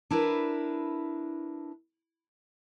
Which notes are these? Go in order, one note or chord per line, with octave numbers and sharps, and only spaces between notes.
D4 E4 A#4 B4